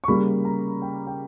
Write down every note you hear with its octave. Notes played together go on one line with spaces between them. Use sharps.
C#6
C#3 G3 A#3 B5
A#5
G5
G5